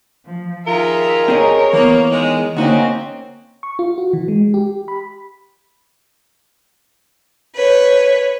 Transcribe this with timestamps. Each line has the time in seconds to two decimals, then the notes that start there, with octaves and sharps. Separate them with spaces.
0.24 F3
0.67 D#3 F4 G#4 A#4 E5
1.28 C4 G#4 C#5 D#5
1.73 E3 A#3 B3
2.11 D#3 G#3
2.56 D2 A#3 C4 C#4 D#4 F#4 D#5
3.63 C#6
3.79 F4
3.98 F#4
4.13 E3
4.28 G#3
4.54 G4
4.88 B5
7.56 B4 C#5